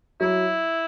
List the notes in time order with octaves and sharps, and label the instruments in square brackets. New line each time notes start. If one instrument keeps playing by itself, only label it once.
[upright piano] F#3 [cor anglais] E4